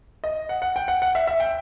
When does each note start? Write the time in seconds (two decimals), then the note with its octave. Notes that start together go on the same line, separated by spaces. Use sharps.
0.24 D#5
0.49 F#5
0.62 F#5
0.76 G5
0.88 F#5
1.02 F#5
1.15 E5
1.27 E5
1.40 G5